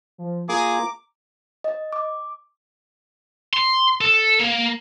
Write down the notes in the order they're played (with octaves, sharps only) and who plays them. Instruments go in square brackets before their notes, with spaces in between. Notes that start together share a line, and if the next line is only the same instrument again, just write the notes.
[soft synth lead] F3
[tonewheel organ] A#3 F4 [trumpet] G#4 [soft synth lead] A#5 [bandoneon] D6
[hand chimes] D#5
D6
[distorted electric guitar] C6
A4
A#3